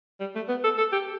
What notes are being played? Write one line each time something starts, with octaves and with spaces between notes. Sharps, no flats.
G3
A3
B3
A4
A4
G4